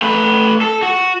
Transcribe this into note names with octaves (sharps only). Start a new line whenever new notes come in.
A3 B4
A4
F#4